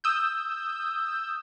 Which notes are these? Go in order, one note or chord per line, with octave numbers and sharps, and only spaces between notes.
D#6 E6 G6